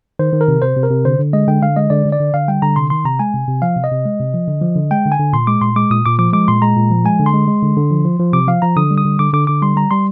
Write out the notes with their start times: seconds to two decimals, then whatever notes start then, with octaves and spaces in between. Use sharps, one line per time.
0.19 D#3 C5
0.33 D#3
0.41 A#4
0.48 C3
0.62 C3 C5
0.77 C3
0.83 A#4
0.90 C3
1.05 D3 C5
1.19 D3
1.33 G#3 D#5
1.48 D3 G5
1.62 D3 F5
1.77 G#3 D#5
1.90 D3 D5
2.05 D3
2.12 D5
2.20 D3
2.34 D3 F5
2.48 G3 G5
2.62 D3 A#5
2.76 C3 C6
2.90 D#3 C6
3.05 C3 A#5
3.19 G#3 G#5
3.34 C3
3.47 C3
3.62 F3 F5
3.76 C3
3.84 D#5
3.91 C3
4.05 G#3
4.20 C3
4.34 F3
4.48 D3
4.62 F3
4.76 D3
4.91 G#3 G5
5.05 D3
5.12 G#5
5.19 D3
5.33 A#2 C6
5.47 G#3 D6
5.62 A#2 C6
5.76 G#3 D6
5.90 A#2 D#6
6.06 A#2 D6
6.19 F3 D6
6.33 G#3 D6
6.48 A#2 C6
6.62 G#3 A#5
6.77 A#2
6.90 F3
7.04 G#3 G#5
7.19 D3
7.26 C6
7.34 G#3
7.47 G#3
7.63 D3
7.77 D3
7.91 F3
8.05 F3
8.19 F3
8.33 C3 D6
8.48 F3 F5
8.62 F3 A#5
8.76 D3 D#6
8.91 G3
8.98 D#6
9.05 D3
9.19 D3 D6
9.33 D3 D6
9.47 D3 D6
9.62 G3 C6
9.76 G3 A#5
9.91 G3 C6